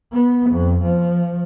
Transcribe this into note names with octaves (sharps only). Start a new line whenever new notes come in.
B3
F2
F3